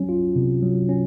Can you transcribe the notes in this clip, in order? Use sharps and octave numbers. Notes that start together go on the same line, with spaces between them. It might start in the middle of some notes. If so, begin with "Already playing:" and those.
Already playing: F#3 C#4
F4
C3
F#3
C#4